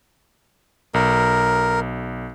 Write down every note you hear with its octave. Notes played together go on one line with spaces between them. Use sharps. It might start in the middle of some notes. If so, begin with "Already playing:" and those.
B1 A#4